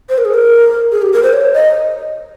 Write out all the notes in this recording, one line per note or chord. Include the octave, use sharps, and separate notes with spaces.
C5
A#4
G#4
A#4
G#4
G4
A#4
C5
C#5
D#5